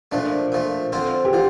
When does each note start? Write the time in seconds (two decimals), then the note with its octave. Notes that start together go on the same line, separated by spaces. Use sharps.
0.12 A#2 F3 A3 D4
0.52 A#2 F3 A3
0.92 D3 F3 C4 F4 A4
1.25 G4
1.33 D3 F3 F4